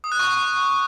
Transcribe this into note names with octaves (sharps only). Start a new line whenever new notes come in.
D#6
F#6
C#6